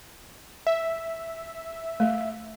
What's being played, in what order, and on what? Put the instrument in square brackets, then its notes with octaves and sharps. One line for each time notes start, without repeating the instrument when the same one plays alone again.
[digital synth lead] E5
[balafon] A3